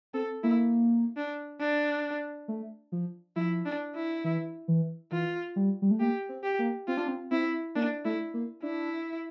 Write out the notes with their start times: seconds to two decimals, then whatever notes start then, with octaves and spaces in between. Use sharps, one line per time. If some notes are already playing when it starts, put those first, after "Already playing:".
0.14 C4 A4
0.43 A#3 E4
1.17 D4
1.60 D4
2.48 A3
2.92 F3
3.36 F3 E4
3.65 D4
3.95 E4
4.24 E3
4.68 E3
5.12 E3 F4
5.56 G3
5.82 G3
5.91 A3
6.00 A#3 G4
6.29 C4
6.43 G4
6.59 A#3
6.87 C4 F4
6.97 D4
7.08 C4
7.31 C4 E4
7.76 A#3 D4
8.05 A3 E4
8.34 A#3
8.63 D4 E4